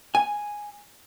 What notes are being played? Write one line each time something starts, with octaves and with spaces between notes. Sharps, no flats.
G#5